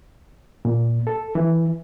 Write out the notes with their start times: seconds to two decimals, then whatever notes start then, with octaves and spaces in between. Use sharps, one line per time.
0.65 A#2
1.07 A4
1.35 E3